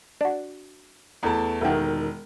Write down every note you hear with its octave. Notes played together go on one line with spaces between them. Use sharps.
D4 F#4
E2 A3 A5
E1 D#3 A3 B3 G4